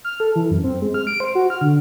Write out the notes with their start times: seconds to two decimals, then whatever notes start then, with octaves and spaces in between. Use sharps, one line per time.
0.05 F6
0.20 A4
0.36 E3
0.51 F#2
0.64 C4
0.82 G#3
0.94 F6
1.07 D7
1.20 C5
1.35 F#4
1.50 F6
1.61 D3